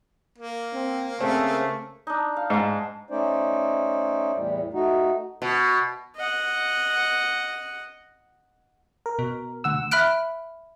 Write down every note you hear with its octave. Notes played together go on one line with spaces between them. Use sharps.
A#3
C4
C#3 A3 C4
D4 D#4
F5
G#2 A5 A#5
A3 C#4 D#4 C5 D5
E2 A2 G3
A3 D#4 F#4
B2
D#5 F#5
A#4
B2
D2 F#5 E6
E5 B5 F6 F#6 D7